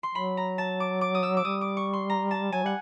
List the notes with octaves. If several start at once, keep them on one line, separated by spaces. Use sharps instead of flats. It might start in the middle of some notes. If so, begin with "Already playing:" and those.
C6
F#3 B5
A#5
A5
D6
D6
D#6
E6
D6
G3 D#6
D6
C#6
C6
A#5
A5
F#3 G#5
G3 F#5